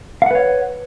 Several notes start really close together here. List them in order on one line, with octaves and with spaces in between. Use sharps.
F5 F#5 B4 C#5